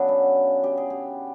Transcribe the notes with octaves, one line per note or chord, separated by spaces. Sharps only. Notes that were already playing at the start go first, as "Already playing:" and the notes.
Already playing: C#3 F#3 B3 D4
E4
G4
G#4
G4